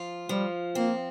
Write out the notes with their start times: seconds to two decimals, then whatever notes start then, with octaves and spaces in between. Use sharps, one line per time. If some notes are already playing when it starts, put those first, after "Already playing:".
Already playing: F3 F4
0.29 F3 G3
0.75 A#3 C4